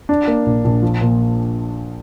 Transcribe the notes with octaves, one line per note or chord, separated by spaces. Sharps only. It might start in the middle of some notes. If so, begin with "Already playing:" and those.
D4
A#3
A#1
A#1
F3
A#2